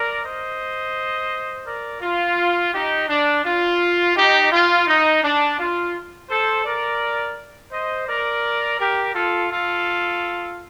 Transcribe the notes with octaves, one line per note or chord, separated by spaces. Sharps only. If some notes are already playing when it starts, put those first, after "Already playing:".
Already playing: A#4 D5
C5 D#5
A#4 D5
F4
D#4 G4
D4
F4
D#4 G4
F4
D#4
D4
F4
A4 C5
A#4 D5
C5 D#5
A#4 D5
G4 A#4
F4 A4
F4 A4